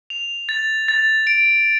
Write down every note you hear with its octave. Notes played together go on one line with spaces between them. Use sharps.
F7
A6
A6
D7